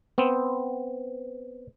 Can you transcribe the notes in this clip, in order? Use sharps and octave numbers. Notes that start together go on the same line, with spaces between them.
B3 C4